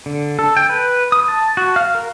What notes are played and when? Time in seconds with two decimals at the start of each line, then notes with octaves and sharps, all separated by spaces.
0.06 D3
0.39 A4
0.57 G5
0.69 B4
1.12 D#6
1.28 A5
1.57 F#4
1.76 F5
1.95 A#4